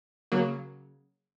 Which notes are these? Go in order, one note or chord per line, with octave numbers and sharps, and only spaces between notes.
C#3 F#3 A#3